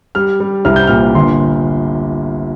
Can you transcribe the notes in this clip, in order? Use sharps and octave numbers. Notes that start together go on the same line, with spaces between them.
G3 F6
G3
C2 F6
G6
A#2 F6
G1 C6